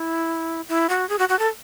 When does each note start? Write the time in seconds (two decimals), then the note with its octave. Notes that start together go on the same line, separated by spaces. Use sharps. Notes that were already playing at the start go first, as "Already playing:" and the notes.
Already playing: E4
0.69 E4
0.89 F#4
1.09 G#4
1.19 F#4
1.29 F#4
1.39 A4